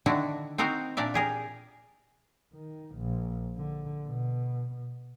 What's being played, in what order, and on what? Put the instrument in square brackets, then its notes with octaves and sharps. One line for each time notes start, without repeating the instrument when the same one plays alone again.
[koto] D3 D#3 D4 E4 F#4
C4 D#4 F#4 A#4 C5
A#2 D4 A#4 D5 E5
G4 G#4 A#4
[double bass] D#3
A#1
D3
B2